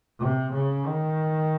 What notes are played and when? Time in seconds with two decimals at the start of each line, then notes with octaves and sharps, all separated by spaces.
0.19 C3
0.53 C#3
0.86 D#3